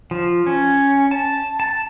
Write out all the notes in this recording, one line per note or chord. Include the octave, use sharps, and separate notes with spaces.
F3
C#4
A5
A5